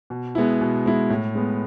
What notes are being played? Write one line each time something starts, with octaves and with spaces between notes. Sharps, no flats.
B2
G#3 B3 E4
B2
G#3 B3 E4
A2
G#3 B3